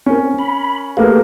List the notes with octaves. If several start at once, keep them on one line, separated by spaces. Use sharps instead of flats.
C4 C#4 A#4
B5
A3 A#3 G4 G#4 B4 F5